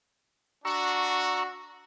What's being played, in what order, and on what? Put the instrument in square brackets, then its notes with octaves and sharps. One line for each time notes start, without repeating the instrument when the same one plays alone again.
[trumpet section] D4 F#4 [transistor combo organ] A#5 C#6 E6